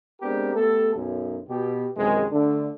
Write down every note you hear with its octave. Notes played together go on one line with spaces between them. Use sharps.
G#3 B3 C4 D4 G4 A#4
A3 B3 G4 A4
B1 F#2
B2 G4
F#2 C3 D#3 E3 G#3
D3 A3 D4